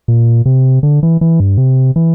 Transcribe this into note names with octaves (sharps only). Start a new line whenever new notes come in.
A#2
C3
D3
E3
E3
G2
C3
E3